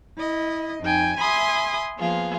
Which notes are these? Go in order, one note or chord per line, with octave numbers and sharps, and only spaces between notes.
E4 D#5
F2 D#4 G5 G#5
E5 G#5 B5 C6 D#6
F3 A#3 B3 F4 G#4